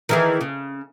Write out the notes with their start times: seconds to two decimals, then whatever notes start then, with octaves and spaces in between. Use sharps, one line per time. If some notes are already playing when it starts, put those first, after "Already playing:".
0.09 D#3 E3 G#4
0.41 C#3